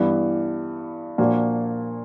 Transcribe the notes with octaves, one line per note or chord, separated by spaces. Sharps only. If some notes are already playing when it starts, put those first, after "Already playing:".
Already playing: G2 E3 G3 B3
A#2 F3 A#3 D4 F#4